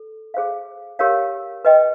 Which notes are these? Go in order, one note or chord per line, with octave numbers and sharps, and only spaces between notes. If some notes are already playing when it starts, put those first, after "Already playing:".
Already playing: A4
G#4 C5 F5
G4 A#4 C#5 F5
B4 D#5 G5